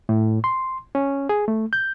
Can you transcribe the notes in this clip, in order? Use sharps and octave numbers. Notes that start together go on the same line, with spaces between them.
A2
C6
C#4
G#4
A3
G6